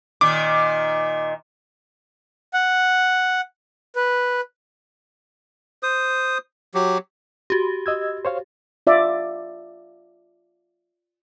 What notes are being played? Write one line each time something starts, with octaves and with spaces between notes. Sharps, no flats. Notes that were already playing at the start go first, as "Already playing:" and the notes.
A#2 D#3 D6
F#5
B4
C5 D#6
F#3 G4
F#4 G4
D#5 E6 G#6
C5 C#5 F5
F4 D5 E5